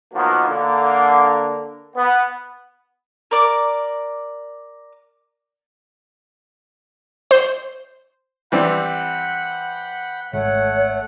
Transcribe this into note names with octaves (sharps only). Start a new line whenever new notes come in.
B2 D#3 F3 F#3 A#3 B3
D3 A#3
B3
A#4 D5 D6
C5
E3 G3 C4 F#5 B5 G6
G#1 A3 C#5 F#5